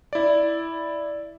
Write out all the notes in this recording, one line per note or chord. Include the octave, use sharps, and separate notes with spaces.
E4 D5